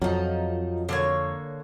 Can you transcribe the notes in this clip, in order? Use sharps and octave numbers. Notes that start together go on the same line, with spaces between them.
F2 F3 F#3 D#4
D3 A#3 C#5